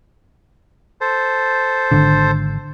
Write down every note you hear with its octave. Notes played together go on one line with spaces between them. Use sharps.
A4 C5
G#1 D3